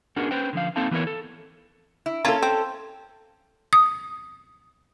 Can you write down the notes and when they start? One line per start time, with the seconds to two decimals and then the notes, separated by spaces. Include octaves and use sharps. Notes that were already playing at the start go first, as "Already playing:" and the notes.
0.16 B3 C#4 D4 F#4 G#4 A#4
0.31 C#4 B4 C5 G5
0.53 D3 F3 F5
0.76 A#3 C4 D#4 A4 F5 A5
0.91 E3 B3 E4 A#4 C#5
1.07 A4
2.06 E4
2.25 A#3 C#4 E4 F4 A4
2.43 C4
3.73 D#6